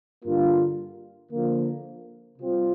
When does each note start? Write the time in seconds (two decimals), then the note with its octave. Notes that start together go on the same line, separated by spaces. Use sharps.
0.24 G2 D3 A#3 F4
1.32 D3 F3 A#3
2.39 C3 G3 C4 F4 C5